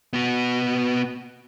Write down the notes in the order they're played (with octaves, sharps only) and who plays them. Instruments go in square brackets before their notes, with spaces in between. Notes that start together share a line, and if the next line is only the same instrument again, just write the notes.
[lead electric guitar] B3 F#4